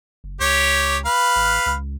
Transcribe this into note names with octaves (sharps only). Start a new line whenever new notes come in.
F#1
C#2 G4 C#5
B4 F5
A1
C#2